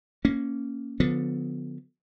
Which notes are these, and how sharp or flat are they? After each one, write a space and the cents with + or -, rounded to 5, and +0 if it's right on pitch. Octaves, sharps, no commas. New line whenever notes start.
A#3 +0 C#4 +0
D3 +0 F3 +30 B3 +10